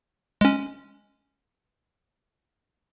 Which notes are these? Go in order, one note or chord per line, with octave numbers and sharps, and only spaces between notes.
G#3 C#4